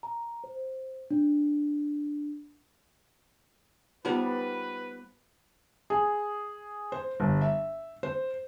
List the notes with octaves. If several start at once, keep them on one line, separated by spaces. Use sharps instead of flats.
A#5
C5
D4
G3 A#3 B3 D#4 F4 B4 C5
G#4
C5
G1
E5
C5